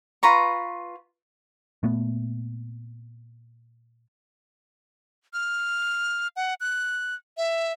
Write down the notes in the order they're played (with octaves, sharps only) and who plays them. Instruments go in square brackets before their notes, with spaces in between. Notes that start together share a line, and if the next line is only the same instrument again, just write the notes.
[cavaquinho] F4 B4 A#5 C#6
[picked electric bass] A#2 A3 B3
[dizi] F6
F#5
F#6
E5